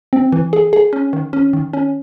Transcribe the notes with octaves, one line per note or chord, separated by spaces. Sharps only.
C4
E3
G#4
G#4
C#4
D#3
C#4
D#3
C#4